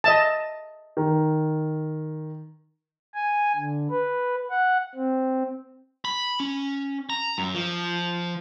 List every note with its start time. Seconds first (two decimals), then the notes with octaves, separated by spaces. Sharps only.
0.04 D#5 E5 A5
0.97 D#3
3.14 G#5
3.56 D3
3.90 B4
4.50 F#5
4.95 C4
6.05 B5
6.40 C#4
7.10 A#5
7.38 F#2
7.55 F3